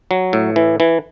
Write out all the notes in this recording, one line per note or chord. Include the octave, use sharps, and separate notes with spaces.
F#3
A2
E3
E3